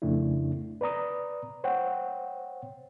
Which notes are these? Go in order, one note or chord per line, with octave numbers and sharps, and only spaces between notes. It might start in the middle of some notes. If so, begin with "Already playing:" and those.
F2 C#3 A3 D4 E4
B4 D5 A#5 D#6
C5 C#5 F#5 G5